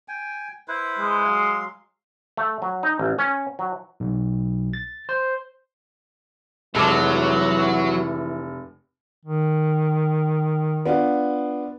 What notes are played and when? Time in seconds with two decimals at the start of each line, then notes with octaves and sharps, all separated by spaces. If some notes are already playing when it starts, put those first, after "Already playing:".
0.08 G5 G#5
0.68 E4 B4 C5
0.99 G#3
1.25 F#3 F5 C6
2.37 A3
2.62 F#3
2.83 D#4
2.99 A1
3.19 C#4
3.59 F#3
4.00 B1
4.73 A6
5.09 C5
6.75 F1 E3 F#3 G#3 A4 D6
9.25 D#3
10.86 B3 D4 F4